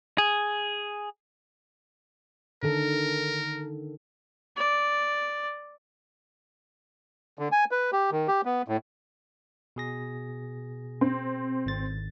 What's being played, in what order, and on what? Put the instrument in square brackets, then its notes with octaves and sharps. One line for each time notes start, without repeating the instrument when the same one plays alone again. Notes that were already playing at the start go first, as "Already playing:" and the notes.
[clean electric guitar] G#4
[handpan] D3 D#3 A4 [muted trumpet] A#4
[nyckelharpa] D5
[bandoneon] D3
G#5
B4
G4
D#3
G4
B3
A2
[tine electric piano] B2 G#4 A#6
[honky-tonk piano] C4
[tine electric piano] G#1 A6